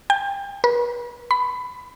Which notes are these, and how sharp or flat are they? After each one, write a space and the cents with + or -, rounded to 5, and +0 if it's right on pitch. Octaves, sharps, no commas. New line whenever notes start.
G5 +30
B4 -40
B5 +15